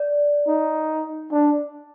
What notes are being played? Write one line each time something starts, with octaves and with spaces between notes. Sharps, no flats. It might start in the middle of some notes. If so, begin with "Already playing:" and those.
Already playing: D5
D#4
D4